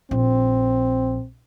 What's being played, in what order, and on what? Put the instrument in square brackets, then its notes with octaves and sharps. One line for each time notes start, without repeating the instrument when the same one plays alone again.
[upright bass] A#1 [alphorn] C4